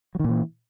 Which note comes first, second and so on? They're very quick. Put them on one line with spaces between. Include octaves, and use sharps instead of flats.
F#3 D#3 A#2 E3